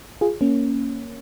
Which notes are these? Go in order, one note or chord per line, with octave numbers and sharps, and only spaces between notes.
F4 G#4
A#3 C#4